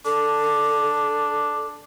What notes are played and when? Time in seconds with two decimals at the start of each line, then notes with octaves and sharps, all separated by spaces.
0.05 D4 A4